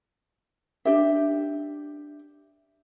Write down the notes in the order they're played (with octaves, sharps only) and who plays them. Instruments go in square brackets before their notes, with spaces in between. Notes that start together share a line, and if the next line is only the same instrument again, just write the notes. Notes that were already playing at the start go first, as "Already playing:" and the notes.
[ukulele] D4 G4 E5